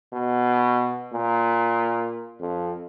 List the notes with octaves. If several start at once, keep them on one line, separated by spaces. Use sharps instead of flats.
B2
A#2
F2